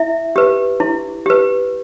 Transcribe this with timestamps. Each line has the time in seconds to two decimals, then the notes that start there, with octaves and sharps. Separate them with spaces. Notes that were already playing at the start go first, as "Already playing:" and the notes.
Already playing: E4 E5
0.36 G4 B4
0.80 E4
1.26 G4 B4